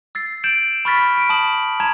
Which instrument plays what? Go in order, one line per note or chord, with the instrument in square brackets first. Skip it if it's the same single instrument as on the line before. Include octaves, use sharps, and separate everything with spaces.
[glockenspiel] E6 A6 C7
G6 A6 D7 E7 F#7
B5 C#6 F6 A6 B6
D7
A5 D#6 F#7
A5 A#5 G#6